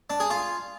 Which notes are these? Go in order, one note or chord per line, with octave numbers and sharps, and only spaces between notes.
D4
G#4
F4